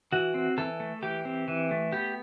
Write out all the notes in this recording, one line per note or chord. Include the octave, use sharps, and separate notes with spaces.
E3 F#4
C4
E3 A4
A3
E3 G4
C4
E3
A3
B3 G4